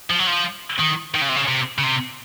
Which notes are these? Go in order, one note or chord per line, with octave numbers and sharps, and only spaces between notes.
F3
F#3
F3
D#3
D#3
C#3
C3
C#3
C3
C#3
C3